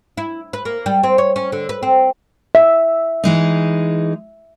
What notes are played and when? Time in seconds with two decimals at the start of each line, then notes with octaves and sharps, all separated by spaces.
0.17 E4
0.53 B4
0.65 A#3
0.86 G3
1.03 C4
1.18 C#5
1.36 C#4
1.52 D3
1.69 B4
1.83 C4
2.55 E5
3.24 E3 G#3 D#4